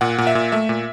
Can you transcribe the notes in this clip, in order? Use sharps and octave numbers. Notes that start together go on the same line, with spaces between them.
A#2 F#5
A#2
E5
A#2
A3 E5
A#2